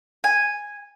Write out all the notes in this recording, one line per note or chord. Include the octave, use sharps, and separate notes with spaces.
G#5